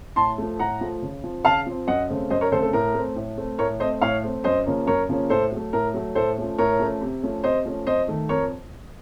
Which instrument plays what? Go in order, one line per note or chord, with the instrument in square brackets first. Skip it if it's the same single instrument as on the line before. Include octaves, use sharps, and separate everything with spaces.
[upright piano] A2 A5 C6
F3 A3
A2 F#5 A#5
F3 A3
C#3
F3 C4
C#3 F5 A5
F3 C4
F#2 D#5 F#5
C#3 A3 C4
F#2 C5 D#5
A#4 C#5
C#3 A3 C4 A4 C5
A4
A2 A#4
A3 C4
A2
A3 C4
A2 A#4 C#5
A3 C4 C5 D#5
A2 C#5 F5
A3 C4
F#2 C5 D#5
C#3 F3 A#3 C#4
F#2 A#4 C#5
C#3 F3 A#3 C#4
A2 A4 C5
F#3 A3
A2 A#4
F#3 A3
A2 A4 C5
F3 A3 C#4
A2 A#4 C#5
F3 A3 C#4
C3
F3 A3 C#4
C3 C5 D#5
F3 A3 C#4
F2 C5 D#5
D#3 A3
F2 A#4 C#5